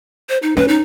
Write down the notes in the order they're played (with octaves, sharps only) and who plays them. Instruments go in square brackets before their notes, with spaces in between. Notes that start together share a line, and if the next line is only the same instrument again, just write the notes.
[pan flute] C5
D#4
[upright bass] C#4 [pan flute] B4
[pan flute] D#4